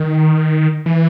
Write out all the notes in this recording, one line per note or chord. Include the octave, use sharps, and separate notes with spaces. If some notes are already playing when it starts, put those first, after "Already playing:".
Already playing: D#3
E3